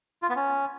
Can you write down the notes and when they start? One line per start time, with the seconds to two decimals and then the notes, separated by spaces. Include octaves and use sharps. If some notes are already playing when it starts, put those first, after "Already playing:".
0.23 F4
0.29 B3
0.36 C#4